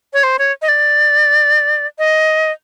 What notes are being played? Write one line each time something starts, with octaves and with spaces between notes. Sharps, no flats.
C#5
C5
C#5
D#5
D5
D#5